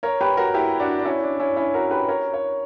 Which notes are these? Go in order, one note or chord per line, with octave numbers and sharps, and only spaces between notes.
A#4 C#5
G4 B4
F#4 A#4
E4 G4
D4 F#4
D4
C#4 E4
D4
C#4 E4
C#4 E4
F#4 A#4
G4 B4
A#4 C#5
A#4 C#5